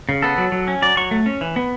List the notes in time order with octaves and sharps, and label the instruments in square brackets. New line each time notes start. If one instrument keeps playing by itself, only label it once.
[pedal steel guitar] C#3
B3 A4
F#3
F#3
C#4
F#3 D5
F#3 C#6
A3
C#4
E3
B3